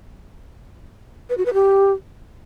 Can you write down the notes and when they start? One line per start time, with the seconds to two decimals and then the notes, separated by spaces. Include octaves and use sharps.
1.30 B4
1.38 F#4
1.46 B4
1.53 G4